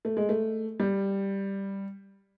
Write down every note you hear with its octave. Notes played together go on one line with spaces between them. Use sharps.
A3
G#3
A3
G3